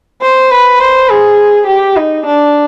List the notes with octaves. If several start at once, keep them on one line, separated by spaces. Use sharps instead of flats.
C5
B4
C5
G#4
G4
D#4
D4